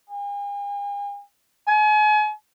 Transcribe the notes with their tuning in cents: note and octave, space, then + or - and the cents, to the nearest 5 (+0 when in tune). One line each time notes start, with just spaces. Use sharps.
G#5 -45
G#5 +35